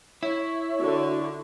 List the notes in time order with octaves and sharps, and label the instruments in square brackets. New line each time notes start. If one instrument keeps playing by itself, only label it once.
[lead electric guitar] E4 [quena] C#5
[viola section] D3 [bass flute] F#4